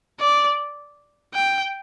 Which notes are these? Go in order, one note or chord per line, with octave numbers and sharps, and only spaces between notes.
D5
G5